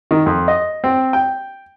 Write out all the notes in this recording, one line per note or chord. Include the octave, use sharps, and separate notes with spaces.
D#3
F2
D#5
C4
G5